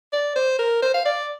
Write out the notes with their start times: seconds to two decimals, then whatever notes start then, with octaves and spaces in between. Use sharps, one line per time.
0.13 D5
0.36 C5
0.59 A#4
0.82 C5
0.94 F5
1.05 D5